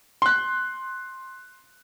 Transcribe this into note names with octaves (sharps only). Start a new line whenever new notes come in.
C6 F#6